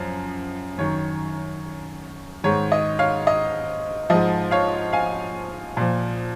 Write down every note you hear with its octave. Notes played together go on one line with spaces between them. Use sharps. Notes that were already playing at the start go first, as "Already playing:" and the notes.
Already playing: F#2 F3
F#2 D#3 C#5
G#2 D#3 C#5
D#5
C#5 F5
D#5
G#2 F3 D#5
C#5 F5
F5 G#5
A#2 F3